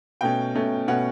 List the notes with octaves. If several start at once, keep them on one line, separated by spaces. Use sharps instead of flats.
B2 A3 C#4 G5
B2 A3 C#4
B2 A3 C#4 F#5